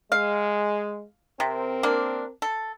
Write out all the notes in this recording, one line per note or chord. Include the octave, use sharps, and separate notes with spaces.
G#3 F5
C3 C4 A#4
A#3 D4
A4